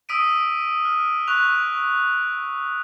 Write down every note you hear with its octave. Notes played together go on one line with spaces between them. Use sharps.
D#6 E6 B6 D7 D#7
F6
C#6 F#6 F7